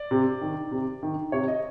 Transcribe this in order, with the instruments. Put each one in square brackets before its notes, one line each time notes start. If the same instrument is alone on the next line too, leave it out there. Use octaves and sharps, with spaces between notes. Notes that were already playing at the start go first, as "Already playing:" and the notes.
Already playing: [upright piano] D5
C3
D#3
C3
D#3
C3 C#5
D#5